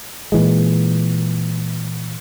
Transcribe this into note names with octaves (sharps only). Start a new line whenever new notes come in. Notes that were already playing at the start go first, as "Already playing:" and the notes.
A#2 E3 G#3